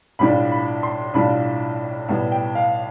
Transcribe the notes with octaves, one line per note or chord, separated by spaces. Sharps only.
B1 A2 G3 D4 F4 B5
B5
C6
B1 A2 G3 D4 F4 B5
B1 A2 G3 B3
G5
F5